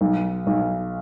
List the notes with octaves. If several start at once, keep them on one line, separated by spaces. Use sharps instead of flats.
B1
B1